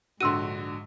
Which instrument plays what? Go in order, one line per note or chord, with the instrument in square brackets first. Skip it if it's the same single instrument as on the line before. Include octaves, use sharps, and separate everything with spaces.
[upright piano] A#1 D3 F#4 [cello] G#2 [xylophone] C6 E6 D#7